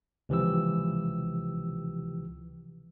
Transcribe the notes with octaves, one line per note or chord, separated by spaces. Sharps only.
C#2 C3 E3 F3 G4 E6